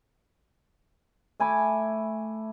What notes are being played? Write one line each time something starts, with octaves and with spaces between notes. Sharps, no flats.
A3 G#5 B5 D6